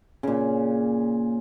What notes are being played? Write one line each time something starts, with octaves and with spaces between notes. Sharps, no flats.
A#2 C#3